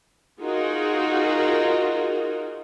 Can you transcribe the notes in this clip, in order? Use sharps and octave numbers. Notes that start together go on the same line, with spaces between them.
D#4 F4 F#4 G#4 A#4